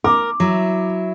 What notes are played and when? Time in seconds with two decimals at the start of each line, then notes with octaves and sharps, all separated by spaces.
0.04 A#4 D6
0.40 F#3 E4